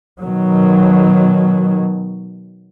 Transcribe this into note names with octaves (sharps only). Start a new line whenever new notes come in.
B2 D#3 F#3